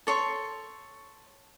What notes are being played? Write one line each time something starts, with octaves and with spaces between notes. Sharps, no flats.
A4 C#5 C6 C#6